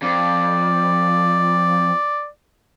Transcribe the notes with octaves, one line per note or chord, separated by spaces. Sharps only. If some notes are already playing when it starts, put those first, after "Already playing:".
F2 D5